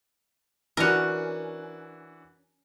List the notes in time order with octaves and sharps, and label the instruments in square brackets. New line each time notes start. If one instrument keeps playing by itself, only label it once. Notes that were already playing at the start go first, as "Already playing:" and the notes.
[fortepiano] E3 D4 F#4 [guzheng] C#4 A#4